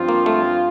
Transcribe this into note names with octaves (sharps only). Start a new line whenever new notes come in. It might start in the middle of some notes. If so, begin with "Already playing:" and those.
Already playing: G2 F3 C4 F4
A#3
A3